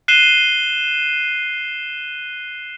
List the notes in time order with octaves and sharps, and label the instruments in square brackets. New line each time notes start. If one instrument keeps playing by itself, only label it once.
[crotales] F#6 C7 D#7 E7 G7